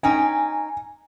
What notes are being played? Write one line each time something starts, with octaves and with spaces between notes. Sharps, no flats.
C#4 D#4 G5 G#5